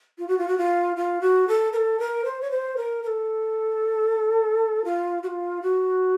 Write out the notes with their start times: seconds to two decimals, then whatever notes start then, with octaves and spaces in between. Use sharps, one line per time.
0.19 F4
0.28 F#4
0.38 F4
0.48 F#4
0.58 F4
0.96 F4
1.21 F#4
1.48 A4
1.73 A#4
1.76 A4
2.00 A#4
2.25 C5
2.41 C#5
2.51 C5
2.77 A#4
3.03 A#4
3.07 A4
4.85 F4
5.23 F#4
5.27 F4
5.62 F#4